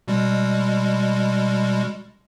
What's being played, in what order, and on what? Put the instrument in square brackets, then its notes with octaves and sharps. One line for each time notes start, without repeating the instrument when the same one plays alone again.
[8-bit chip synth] B2 G3 G#3